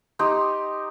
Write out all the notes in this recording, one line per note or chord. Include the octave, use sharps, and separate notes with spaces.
D#4 G4 A#5 C6